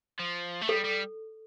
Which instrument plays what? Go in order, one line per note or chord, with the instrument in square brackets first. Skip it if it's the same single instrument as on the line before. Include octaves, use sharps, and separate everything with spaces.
[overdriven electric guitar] F3
A3
[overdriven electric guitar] G3 [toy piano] A4
[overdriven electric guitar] G3